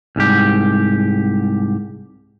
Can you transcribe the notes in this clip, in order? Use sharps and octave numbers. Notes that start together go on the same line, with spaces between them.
C2 G#2 G4